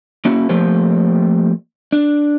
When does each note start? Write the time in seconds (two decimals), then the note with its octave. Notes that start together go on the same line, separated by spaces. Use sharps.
0.25 A#3 C#4 E4 F#4
0.49 F3 A3 A#3 C4 G4 C5
1.92 D4